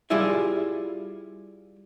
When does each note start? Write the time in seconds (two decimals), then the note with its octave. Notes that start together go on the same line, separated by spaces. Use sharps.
0.10 G3 E4 F4 G#4 E5